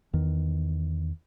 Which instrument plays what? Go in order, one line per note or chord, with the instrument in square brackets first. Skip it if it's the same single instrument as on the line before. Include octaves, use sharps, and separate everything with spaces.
[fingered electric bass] E2 D#3